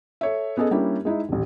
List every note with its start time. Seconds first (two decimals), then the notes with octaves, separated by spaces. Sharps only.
0.21 A4 C#5 E5
0.57 B3 C#4 G#4 A4 D#5
0.71 G3 A#3 C#4 D4 E4 G4
1.05 G#3 D#4 E4
1.29 D#1 A1